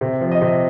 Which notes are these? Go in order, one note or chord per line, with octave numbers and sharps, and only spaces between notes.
C3
F3
D#5
C3